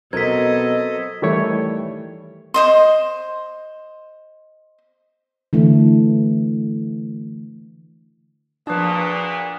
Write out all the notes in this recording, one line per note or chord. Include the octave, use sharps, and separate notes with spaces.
B2 F#3 C4 A4 A#4 D#5 G#6 B6
D#3 E3 G3 A3 E4 C#5
C5 D#5 C6
D3 E3 A3
A#2 F3 D4 F#4 G#4 B4 A5